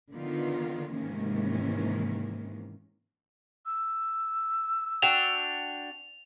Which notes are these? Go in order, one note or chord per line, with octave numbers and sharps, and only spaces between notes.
D3 D#3 B3 F4
G#2 C3 D#3 E3 A#3 C#4
E6
D4 F#4 G5 F7